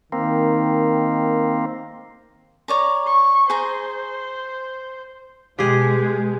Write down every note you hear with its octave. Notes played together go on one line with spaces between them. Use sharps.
D#3 A#3 C4
C#5 D5 A#5
C#6
G#4 C5 A#5
B2 G#3 G4 G#4